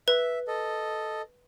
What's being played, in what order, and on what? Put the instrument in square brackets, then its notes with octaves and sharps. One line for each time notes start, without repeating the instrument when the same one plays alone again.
[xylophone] B4 [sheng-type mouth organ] E5
[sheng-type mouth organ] A4 D#5